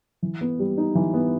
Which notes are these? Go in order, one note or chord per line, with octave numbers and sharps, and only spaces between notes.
E3
B3
G3
D#4
E3
B3